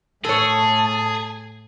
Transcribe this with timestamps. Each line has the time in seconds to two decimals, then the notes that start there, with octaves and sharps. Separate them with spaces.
0.25 A2 G#4 A4 C#5 A5